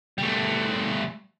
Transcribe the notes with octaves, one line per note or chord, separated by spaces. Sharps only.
G3 A3